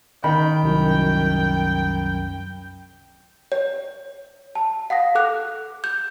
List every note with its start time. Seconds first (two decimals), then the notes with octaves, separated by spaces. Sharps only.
0.24 D#3 G5 B5
0.63 C2 F#2
3.52 C#5
4.55 A5
4.90 F5 F#5 D#6 A#6
5.15 A4 D6 F#6
5.84 G6